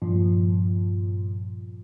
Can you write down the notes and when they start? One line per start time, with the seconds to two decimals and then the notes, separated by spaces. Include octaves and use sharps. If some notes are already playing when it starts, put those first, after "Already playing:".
0.02 G2 A#2 F3